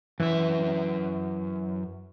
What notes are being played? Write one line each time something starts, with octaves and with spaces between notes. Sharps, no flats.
F#2 E3 E5